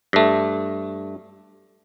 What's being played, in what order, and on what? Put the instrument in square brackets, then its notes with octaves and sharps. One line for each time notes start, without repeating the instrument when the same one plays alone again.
[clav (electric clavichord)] G2 A3